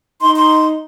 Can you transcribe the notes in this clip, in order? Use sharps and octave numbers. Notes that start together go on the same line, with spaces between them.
D#4 C6
C6